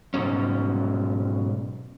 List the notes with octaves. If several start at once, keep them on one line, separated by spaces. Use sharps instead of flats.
G#2 B2 F#3 C#4